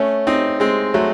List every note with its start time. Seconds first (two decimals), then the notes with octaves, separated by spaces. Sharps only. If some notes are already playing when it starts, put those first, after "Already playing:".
Already playing: A3 C#4
0.27 C4 D#4
0.60 G#3 C4
0.94 F#3 A3